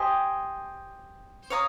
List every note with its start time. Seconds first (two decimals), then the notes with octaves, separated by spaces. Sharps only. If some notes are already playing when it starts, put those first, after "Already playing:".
Already playing: G4 C5 D#5 G#5
1.50 C#5 F5 A#5 D#6